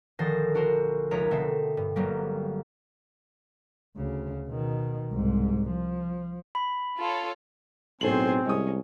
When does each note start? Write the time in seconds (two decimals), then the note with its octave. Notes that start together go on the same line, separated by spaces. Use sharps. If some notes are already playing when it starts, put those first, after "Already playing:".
0.19 A#1 D3 D#3 C5 A6 A#6
0.55 D4 F#4 A#4 C5
1.11 F1 C#2 D#4 A#4 C#5 B6
1.31 B2 D3 A3 C4 E5
1.77 G2
1.96 G1 F#3 G3 A#3
3.96 D2 C#3
4.47 B2 D#3
5.13 C2 G#2
5.70 F3
6.55 B5
6.98 F4 A4 C#5
8.01 B1 A2 C4 G#4 A4 C5 F#7
8.46 C2 G#3 C#4 D#6